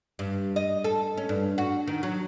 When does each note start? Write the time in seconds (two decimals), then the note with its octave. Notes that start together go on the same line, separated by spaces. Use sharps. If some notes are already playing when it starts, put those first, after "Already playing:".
0.19 G2
0.56 D#5
0.84 A4
1.17 C#4
1.29 G2
1.58 F#4
1.87 D#3
2.03 F#3